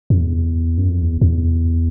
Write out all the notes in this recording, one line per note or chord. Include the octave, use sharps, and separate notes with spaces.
F2
E2
F#2
F2
E2
E2